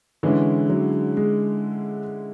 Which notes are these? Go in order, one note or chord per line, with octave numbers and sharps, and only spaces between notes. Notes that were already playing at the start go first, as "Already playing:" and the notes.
D3 E3 G#3 C#4 E4
F#3
G#3